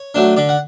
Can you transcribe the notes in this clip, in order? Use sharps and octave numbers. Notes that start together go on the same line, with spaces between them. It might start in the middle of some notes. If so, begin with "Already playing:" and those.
Already playing: C#5
F#3 A3 D4
D3 D5
F#5